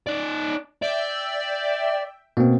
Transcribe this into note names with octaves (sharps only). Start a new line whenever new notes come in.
D#4 D5
D5 E5 G5
B2 A#3 C4